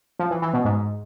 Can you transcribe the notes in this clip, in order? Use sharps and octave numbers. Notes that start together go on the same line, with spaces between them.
F3
E3
E3
B2
G#2